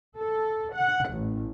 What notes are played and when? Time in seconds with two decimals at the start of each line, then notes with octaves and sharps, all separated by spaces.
0.16 A4
0.74 F#5
1.11 A1